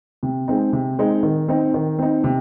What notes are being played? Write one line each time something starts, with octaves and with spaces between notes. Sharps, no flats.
C3
G#3 C4 D#4
C3
G#3 C4 D#4
D#3
C4 D#4
D#3
C4 D#4
C3